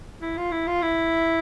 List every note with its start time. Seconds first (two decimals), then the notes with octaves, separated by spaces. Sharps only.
0.22 E4
0.37 F4
0.52 E4
0.67 F4
0.82 E4